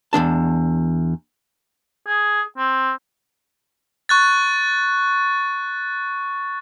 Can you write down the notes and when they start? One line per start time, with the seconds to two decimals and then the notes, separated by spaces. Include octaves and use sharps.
0.13 E2 F#3 D4 A5
2.07 G#4
2.57 C4
4.09 C#6 F#6 A6